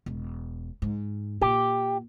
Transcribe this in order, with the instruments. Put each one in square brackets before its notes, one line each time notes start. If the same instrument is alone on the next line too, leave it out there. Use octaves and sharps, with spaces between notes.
[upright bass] E1
G#2
[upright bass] A#2 [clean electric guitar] G4